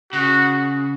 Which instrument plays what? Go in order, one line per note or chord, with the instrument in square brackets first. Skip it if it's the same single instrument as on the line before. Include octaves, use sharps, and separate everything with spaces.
[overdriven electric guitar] C#3 [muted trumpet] F#4